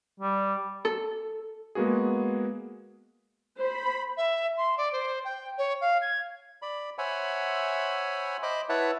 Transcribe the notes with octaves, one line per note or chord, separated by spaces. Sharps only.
G3
A4
G#3 A#3 B3 F#4 G#4
C5 B5
E5
C6
D5
C5
G5
C#5
F5
G#6
D5 B5
C5 C#5 E5 F#5 G#5 B5
C5 D#5 B5 D6
E4 B4 C#5 E5 F#5 A5